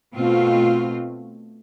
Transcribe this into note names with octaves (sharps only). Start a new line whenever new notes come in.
B2 A3 C4 F4